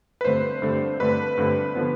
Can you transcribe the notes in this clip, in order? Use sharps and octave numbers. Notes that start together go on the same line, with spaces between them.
B4
G2 D3 A3 C4 C5
G2 D3 A3 C4
G2 D3 A3 C4 B4
G2 D3 A3 C4
D3 F3 B3